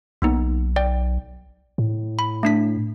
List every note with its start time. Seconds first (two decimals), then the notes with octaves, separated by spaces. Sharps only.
0.22 B1 A#3 B3 D#4
0.76 D5 G5
1.78 A2
2.19 B5
2.43 A3 D4 B6